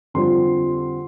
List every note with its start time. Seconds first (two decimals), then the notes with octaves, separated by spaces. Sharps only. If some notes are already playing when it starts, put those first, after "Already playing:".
0.14 F2 D3 G3 C4 F4 C6